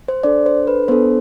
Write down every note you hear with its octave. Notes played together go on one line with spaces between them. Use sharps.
C5
D4 A4 D5
C5
B4
B3 D4 A4 C5